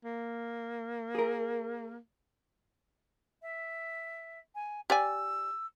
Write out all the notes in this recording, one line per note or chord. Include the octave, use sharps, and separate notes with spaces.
A#3
G#4 A#4
E5
G#5
G4 D5 G#5 E6